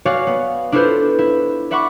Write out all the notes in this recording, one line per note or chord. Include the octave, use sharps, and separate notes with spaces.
F#4 C#5 D5 F5 G#5
B3
D4 E4 F4 A4 B4 C5
E4
D5 E5 F#5 B5 C#6 D6